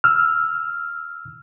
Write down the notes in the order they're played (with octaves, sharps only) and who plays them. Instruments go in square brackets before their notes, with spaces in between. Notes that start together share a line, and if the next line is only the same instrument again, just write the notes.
[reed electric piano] E6 F6